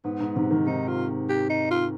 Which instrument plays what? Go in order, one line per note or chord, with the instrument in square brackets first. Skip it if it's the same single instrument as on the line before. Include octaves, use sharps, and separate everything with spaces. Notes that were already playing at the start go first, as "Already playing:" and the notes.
[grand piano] G#2 [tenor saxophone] B3
[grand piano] G#2
G#2 C3
C3 D#3
[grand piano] C3 D#3 [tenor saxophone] D#4
[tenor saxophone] F4
G4
D#4
F4